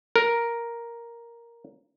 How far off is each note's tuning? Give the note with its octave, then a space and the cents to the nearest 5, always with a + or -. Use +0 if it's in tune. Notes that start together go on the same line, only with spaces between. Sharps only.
A#4 +5